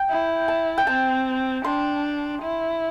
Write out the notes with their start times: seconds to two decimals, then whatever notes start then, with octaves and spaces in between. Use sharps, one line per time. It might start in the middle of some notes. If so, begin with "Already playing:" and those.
Already playing: G5
0.10 E4
0.48 A5
0.78 G5
0.87 C4 A5
1.64 D4 C6
2.42 E4